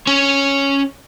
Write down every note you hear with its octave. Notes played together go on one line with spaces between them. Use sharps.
C#4 C#5